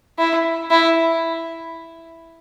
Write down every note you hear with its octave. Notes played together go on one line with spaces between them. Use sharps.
E4
E4